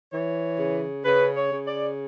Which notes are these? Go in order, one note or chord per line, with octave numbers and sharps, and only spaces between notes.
E3 C#5
C#3
C#3 B4
C#5
C#3
D5